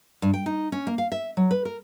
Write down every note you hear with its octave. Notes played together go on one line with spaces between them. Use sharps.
G2
G5
D#4
C#4
A#3
F5
E5
F#3
B4
A#4